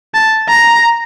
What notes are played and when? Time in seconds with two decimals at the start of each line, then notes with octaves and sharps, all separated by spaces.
0.14 A5
0.49 A#5